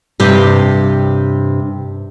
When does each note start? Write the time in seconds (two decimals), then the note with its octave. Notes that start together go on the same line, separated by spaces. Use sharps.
0.20 G2 C3 G4